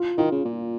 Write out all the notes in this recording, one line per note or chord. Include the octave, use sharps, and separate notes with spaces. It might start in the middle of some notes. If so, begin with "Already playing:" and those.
Already playing: F4
D#3 F4
C#3
A#2